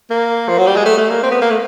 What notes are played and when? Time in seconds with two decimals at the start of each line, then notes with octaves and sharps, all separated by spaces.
0.10 A#3
0.48 F3
0.58 F#3
0.67 G3
0.76 G#3
0.86 A3
0.98 A3
1.10 A#3
1.23 C4
1.31 B3
1.42 A#3
1.50 A3